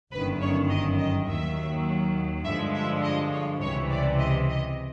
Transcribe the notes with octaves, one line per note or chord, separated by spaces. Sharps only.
G1 F#2 D#3 B4
C#5
D#5
D#5
D#2 D#3 F#3 E5
G2 D3 F3 G#3 E5
E5
D#5
C#5
C#2 C3 E3 C#5
D5
D#5
D#5